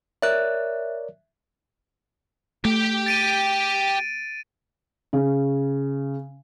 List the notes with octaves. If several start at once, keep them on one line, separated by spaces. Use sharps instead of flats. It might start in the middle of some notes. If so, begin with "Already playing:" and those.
A#4 C#5 D5 E5 F#6
A3 G4 G5
A6 D7 D#7
C#3